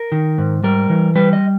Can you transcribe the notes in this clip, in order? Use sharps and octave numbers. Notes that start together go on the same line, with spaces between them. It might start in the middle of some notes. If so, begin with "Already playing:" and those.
Already playing: A#4
D#3
G#2
G3 A#4
E3
G3 B4
D#5